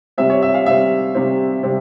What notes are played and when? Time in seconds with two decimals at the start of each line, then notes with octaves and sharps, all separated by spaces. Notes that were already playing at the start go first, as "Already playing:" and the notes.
0.18 C3 G3 C4 E5
0.30 C#5
0.42 E5
0.54 F5
0.66 C3 G3 C4 E5
1.15 C3 G3 C4
1.63 C3 G3 C4